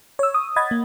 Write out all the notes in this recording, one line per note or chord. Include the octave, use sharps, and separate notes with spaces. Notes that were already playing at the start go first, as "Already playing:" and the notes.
C#5 E6
D#6
D#5 F#5 B5 G#6 A6
A#3